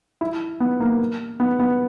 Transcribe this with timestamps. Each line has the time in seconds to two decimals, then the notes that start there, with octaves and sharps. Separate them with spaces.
0.21 E4
0.60 B3
0.80 A#3
1.40 B3
1.59 B3